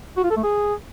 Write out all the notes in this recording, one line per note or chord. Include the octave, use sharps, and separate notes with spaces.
F#4
F4
A4
A3
G#4